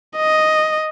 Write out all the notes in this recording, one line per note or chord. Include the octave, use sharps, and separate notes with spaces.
D#5